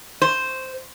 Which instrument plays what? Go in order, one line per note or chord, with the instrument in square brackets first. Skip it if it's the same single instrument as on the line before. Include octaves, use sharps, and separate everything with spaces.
[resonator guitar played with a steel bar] C5